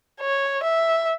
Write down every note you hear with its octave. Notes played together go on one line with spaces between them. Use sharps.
C#5
E5